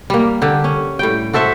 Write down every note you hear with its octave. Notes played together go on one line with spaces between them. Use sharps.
G3 A#3
D3 G4
C#4
A2 G3 G5
F#4 A4 C5 E5